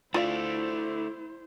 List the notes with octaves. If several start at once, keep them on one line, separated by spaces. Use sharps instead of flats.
A3 D4 E4 F4 C5 D5 F5